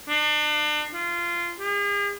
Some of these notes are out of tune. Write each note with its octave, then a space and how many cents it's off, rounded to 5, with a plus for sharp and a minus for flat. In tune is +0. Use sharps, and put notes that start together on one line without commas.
D4 +35
F4 -20
G#4 -45